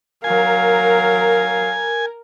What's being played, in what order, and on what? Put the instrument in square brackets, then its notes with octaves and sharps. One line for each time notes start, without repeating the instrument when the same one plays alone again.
[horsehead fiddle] F#3 F5 [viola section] A#4 [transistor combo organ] G#5